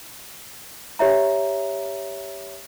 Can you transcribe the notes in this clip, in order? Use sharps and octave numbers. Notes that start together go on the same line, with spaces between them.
G4 C#5 E5 A#5